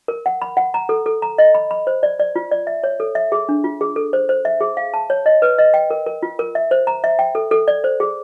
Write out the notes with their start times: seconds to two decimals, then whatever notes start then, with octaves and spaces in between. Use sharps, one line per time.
0.08 A#4
0.26 F#5
0.42 B5
0.57 F#5
0.74 A#5
0.89 A4
1.06 A4
1.22 A#5
1.38 D#5
1.55 B5
1.71 B5
1.87 C5
2.03 D5
2.19 D5
2.36 F4
2.51 D5
2.67 E5
2.84 C#5
3.00 A4
3.15 E5
3.32 G#4
3.49 D4
3.64 F4
3.81 G#4
3.96 A4
4.13 C5
4.29 C5
4.45 E5
4.61 G#4
4.77 F5
4.94 A5
5.10 C#5
5.26 D#5
5.42 B4
5.58 D#5
5.74 G5
5.91 A#4
6.06 A#4
6.23 F4
6.39 A#4
6.55 E5
6.71 C5
6.87 A#5
7.04 E5
7.19 G5
7.35 A4
7.51 A4
7.68 D5
7.84 C5
8.00 G#4